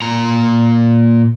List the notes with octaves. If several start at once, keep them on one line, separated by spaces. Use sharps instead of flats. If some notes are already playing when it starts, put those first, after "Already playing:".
A#2 A#5